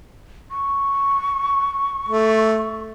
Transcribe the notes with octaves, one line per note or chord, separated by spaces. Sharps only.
C#6
A3